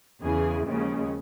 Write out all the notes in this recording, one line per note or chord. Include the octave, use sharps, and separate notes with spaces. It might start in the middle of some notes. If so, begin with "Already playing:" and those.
E2 C#3 E3 G#4
D#2 C#3 F3 G#3 C#4